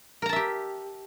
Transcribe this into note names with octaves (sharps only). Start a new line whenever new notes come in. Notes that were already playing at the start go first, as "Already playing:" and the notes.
G4 A#4 E5 A5 A#5